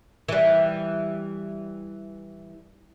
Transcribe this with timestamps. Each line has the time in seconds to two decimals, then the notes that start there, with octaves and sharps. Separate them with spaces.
0.28 E3 G3